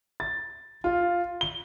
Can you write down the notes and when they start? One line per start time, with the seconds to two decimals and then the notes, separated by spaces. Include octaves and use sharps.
0.20 A6
0.84 F4
1.41 G7